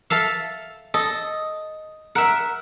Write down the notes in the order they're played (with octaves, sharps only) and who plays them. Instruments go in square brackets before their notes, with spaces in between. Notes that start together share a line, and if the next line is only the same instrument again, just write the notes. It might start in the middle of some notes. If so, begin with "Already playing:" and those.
[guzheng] A4 E5 F5
[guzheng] A4 [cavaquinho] D#5
[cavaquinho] A#4 [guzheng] E5 F#5